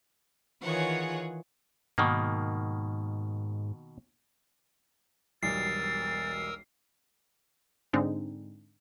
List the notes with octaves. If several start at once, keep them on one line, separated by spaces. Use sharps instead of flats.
D#3 E3 F4 G#4 C#5 F#5
G#2 B2 D#3 A#3
E1 B1 G3 A#4 D#6 E6 A6 C7
G#2 D3 G#3 C4 D4 D#4